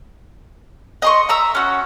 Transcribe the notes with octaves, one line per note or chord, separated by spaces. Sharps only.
D#5 C6 C#6
E5 A#5 E6
C#4 F#4